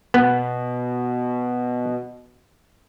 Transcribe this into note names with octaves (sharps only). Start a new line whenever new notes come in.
B2 B3